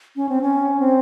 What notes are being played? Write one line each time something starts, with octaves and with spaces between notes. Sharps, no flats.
C#4
C4
C#4
C4